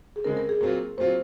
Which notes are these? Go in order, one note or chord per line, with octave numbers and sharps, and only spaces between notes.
G#4
C#3 G#3 C4 A#4
A#4
G#4
A#2 F#3 C4 F4 A#4
A#2 F#3 C4 F4 C5